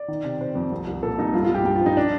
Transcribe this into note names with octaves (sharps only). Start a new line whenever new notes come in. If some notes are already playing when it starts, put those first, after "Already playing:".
Already playing: D5
D#3
C3
C3 C5
F2
C2
C2
A#2 A4
C2 D#4
G2 F4
F4
G2
G4
G2 G4
F4
F3
D#4
D4